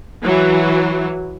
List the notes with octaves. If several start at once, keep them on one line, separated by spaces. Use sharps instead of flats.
E3 F#3